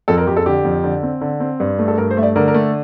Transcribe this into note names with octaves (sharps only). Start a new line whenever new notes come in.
F2 A4
A#4
F2 G4
A4
D3 G4
F2
D3
C4
D3
C4
G2
A3
A4
G2 A#4
C5
A3 E5
D5
D3 A#4
A#4
A3